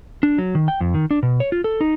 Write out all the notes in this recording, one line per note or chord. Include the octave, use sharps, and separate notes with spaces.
D4
F#3
D#3
G5
F2
D#3
D4
B2
C#5
F4
A4
D#4